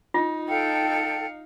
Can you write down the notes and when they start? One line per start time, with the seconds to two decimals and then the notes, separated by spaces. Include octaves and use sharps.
0.14 D#4 F4
0.48 A4 F5 G5 C#7